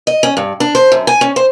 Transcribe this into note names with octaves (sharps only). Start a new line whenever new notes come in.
D#5
C#4
G2
D4
C5
F#2
G#5
C#4
C5